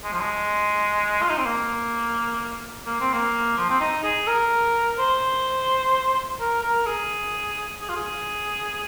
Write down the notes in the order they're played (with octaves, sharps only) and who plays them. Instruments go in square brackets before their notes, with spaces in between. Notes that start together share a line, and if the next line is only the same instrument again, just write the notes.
[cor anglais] G#3
F3
G#3
F4
D#4
C4
A#3
A#3
C4
A#3
F3
C4
D#4
G#4
A#4
C5
A#4
A#4
G#4
G#4
F4
G#4